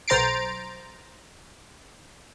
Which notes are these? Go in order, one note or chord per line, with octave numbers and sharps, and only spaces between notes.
B1 C5 A#5 A6 C7 D7